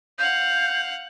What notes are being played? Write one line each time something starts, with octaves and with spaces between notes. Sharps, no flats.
F5 F#5 G6